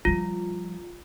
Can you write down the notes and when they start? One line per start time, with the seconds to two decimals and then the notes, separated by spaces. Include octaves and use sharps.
0.05 F3 G3 F4